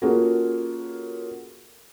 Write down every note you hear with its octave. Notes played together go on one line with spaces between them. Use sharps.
A#3 C#4 F4 F#4 G#4 A4